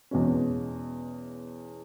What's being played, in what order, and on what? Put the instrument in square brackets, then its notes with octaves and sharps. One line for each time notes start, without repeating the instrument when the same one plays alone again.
[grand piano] E2 B2 G#3 C#4